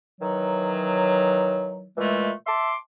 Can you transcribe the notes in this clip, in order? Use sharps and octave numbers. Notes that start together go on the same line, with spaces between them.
D#3 E3 F#3
A#2 E3 G#3 A3
E5 A5 C6 D6